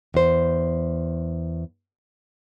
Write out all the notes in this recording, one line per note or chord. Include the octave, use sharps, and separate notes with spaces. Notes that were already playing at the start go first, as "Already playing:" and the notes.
E2 C5